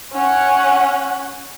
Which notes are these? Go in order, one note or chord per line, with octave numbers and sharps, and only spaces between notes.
C#4 F#5